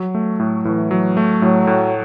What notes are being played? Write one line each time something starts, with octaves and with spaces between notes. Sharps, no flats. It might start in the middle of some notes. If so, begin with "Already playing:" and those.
Already playing: F#3
A3
A2
A2 E3
F#3
A3
A2 F#3
A2